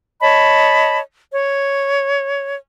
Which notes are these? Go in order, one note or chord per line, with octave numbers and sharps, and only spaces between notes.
C#5 D#5 A5 B5
C#5